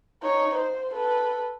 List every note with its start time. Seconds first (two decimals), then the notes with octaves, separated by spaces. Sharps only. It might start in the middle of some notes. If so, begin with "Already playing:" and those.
0.22 D#4 C#5
0.55 C5
0.93 A4 B4